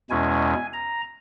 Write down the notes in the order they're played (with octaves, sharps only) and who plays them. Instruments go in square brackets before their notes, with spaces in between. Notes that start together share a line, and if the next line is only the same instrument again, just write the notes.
[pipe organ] E2 B2 G#3 C#4 E4 G#5
A#5